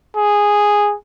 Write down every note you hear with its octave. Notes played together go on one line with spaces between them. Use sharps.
G#4